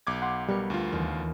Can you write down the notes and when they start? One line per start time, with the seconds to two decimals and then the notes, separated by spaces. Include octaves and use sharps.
0.07 B1 D6 G#6
0.22 F#5 C6
0.49 G3 B3 A#4 C#6
0.70 D2 F4
0.91 D#2 E3